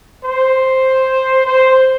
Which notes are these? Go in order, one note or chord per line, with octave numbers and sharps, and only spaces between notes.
C5
C5